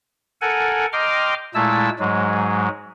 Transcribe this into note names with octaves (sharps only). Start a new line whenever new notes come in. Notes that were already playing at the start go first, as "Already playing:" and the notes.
A4 A#4 F#5 G#5
D#5 G5 A#5 C6 D6 F6
A#2 G#3 A3 E4 A5 E6
G#2 F#3 G#3